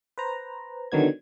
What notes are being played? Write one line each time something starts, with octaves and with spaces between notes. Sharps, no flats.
B4 C5 A#5
D3 D#3 F#3 B3 G#6